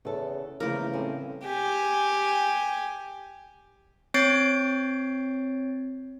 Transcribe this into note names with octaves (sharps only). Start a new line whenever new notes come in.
E2 C#3 A4
E2 C#3 F3 A3 A#3 F4 A#4
A2 G3 C4 C#4
G4 G#5
C4 C#5 G6 A6 C7 D7